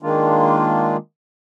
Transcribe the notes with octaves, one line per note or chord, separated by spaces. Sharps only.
D#3 G#3 A#3 D4 F4